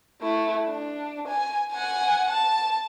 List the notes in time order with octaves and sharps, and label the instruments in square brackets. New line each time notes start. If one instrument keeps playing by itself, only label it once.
[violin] A3 E4
D4
G#5
F#5 G#5
A5